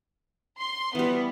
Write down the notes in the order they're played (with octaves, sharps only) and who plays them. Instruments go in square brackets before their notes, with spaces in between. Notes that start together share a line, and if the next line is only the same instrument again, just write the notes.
[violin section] C6
[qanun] E3 G3 [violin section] B3